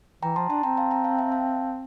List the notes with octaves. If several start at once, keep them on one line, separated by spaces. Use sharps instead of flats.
E3 G5 A#5
F3 A5 C6
D4 A5 C6
C4 G5 A#5
F5 A5
G5 A#5
F5 A5
E5 G5
F5 A5